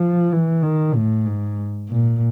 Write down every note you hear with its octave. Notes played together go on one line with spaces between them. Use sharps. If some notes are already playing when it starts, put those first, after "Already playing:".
Already playing: F3
E3
D#3
A2
G#2
A#2